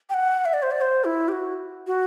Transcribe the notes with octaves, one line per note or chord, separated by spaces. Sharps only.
G5
F#5
E5
D5
C5
D5
C5
E4
G4
F#4
F#4